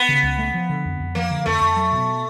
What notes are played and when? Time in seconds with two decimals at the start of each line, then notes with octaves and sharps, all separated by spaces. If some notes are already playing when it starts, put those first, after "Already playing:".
Already playing: B3
0.09 C#3
0.23 C#2
0.38 A3
0.54 F3
0.69 D3
0.85 F2
1.00 F2
1.15 F3 A#3
1.31 D3
1.46 F2 A3
1.61 F2
1.76 F#3
1.92 B2